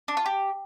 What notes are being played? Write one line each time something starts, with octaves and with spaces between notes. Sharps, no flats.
D4
F4
G4